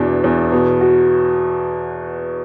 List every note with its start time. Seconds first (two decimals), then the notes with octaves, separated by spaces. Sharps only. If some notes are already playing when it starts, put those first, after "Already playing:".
Already playing: E2 B2 B3 D4
0.24 E2
0.52 B2
0.81 F#4